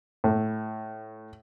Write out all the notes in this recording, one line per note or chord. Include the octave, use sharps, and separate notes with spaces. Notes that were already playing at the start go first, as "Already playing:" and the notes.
A2